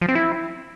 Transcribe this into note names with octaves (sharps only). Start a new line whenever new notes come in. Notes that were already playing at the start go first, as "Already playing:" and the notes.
F3
C4
E4